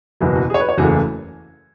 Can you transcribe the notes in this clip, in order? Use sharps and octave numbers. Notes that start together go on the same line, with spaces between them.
F#1 E2 B2 F#3 B3 E4
F#4
G#4
C#5
B4
C#5
F#1 E2 C#3 E3 A3 F#4